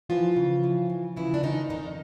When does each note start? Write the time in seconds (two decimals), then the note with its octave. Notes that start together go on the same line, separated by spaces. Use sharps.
0.10 E3 F3 F4
0.36 C#3
0.64 E3
0.90 C#3
1.16 C#3 E3 E4
1.34 D4
1.43 F2 D#3 D#4
1.70 F2 D#3 D#4